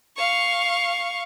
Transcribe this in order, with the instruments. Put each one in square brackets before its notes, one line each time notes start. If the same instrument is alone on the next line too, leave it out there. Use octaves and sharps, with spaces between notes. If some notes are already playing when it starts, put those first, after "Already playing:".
[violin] F5 C#6